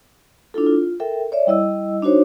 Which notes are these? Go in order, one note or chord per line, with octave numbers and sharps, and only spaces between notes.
D4 E4 F4 A4
F4
A4 A#4 E5 G5
C#5 D5 E5
G3 E4 D#5 E6
D4 D#4 F#4 C5 C#5